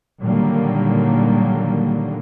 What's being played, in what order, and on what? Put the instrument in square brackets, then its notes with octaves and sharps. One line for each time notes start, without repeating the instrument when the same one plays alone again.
[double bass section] A#2 D3 D#3 F#3 G3 A#3